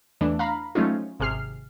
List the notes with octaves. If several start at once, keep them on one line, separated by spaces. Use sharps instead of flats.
E2 E3 A3 D4
F5 A#5 B5
F3 F#3 A3 C#4 D#4 F4
G#1 C3 G#4 F6 C7